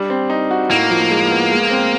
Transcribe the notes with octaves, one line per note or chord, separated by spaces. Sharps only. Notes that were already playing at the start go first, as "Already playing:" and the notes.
Already playing: G3 D4
C4
D#4
F#4
A2 A#3
F3
G#3
B3
G#3
C4